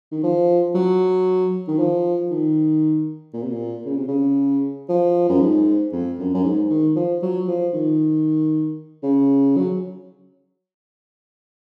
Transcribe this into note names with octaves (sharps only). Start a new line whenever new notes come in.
D#3
F3
F#3
D#3
F3
D#3
A#2
C3
A#2
C#3
C3
C#3
F3
F#2
G#2
F2
F#2
F#2
G#2
D#3
F3
F#3
F3
D#3
C#3
F#3